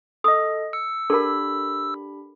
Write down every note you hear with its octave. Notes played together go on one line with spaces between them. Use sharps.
A4 D#5 D#6
E6 C#7
D4 G4 A4 A#4 B5